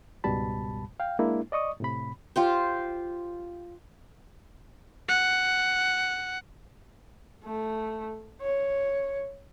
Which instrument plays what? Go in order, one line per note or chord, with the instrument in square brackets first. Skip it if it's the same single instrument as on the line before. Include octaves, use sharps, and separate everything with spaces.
[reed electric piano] C#2 G#2 B2 G3 A5 B5
F5 G5
G#3 A#3 D4 E4
D5 D#5 C#6 D#6
A2 C3 B5
[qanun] F4 G4 C5
[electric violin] F#5
[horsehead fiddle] A3
C#5